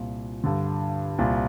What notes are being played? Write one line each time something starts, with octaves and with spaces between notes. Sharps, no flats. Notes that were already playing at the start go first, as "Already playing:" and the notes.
Already playing: C2 A#2
G2 D3
C2 A#2